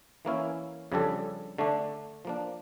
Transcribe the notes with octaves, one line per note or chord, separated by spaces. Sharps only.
E3 A#3 C#4 E4
F2 C#3 G3 D4 A4
D3 A3 D4
F3 A#3 D4